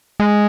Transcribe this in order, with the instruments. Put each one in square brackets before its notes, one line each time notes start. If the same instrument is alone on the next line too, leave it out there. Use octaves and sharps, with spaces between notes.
[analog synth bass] G#3